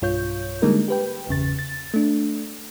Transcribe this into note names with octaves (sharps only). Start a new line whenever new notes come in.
B1 G2 F4 C#5 G6
D3 G3 G#3 A#3 D#4 A#4
G4 B4 G5
G1 E2 C#3 A6
A6
A3 D4